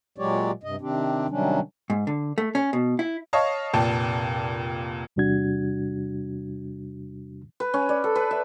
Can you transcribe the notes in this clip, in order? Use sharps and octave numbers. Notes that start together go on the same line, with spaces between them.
A#2 F#3 G#3 G4 C#5 D5
G2 C3 D#5
C3 D#3 C4 D4 G4
C3 D#3 F#3 G3 C#4 D4
G#2
D3
A3
C#4
B2
E4
C#5 D#5 F5 A5 C#6
F1 A#2 G5 A5
E2 C3 G3 D4 F#4 G#6
B4
C#4
D5
A4
B4
E5